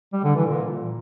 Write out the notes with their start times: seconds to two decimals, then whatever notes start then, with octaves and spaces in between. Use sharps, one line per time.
0.13 G3
0.24 D3
0.35 E3
0.47 A#2